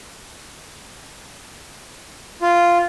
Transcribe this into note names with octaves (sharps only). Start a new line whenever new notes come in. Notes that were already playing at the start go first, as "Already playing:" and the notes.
F4